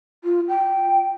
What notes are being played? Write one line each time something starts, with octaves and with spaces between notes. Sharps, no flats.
F4
G5